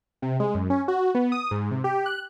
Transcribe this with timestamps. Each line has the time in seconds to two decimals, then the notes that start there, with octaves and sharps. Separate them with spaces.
0.22 C3
0.40 G#3
0.55 F#2
0.70 C#4
0.88 F#4
1.15 B3
1.32 D#6
1.51 G#2
1.71 C3
1.84 G4
2.06 F#6